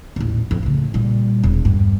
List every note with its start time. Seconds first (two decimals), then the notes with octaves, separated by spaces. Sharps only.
0.16 D#1 A1
0.51 F2
0.63 A2 C#3
0.94 A#2 G3
1.43 E1
1.65 G2